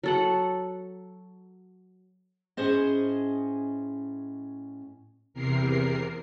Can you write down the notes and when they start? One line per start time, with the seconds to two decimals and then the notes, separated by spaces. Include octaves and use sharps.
0.03 F#3 A4 F#5
2.57 A2 C#4 G#4 C5 D#5
5.34 E2 C3 A#4 C7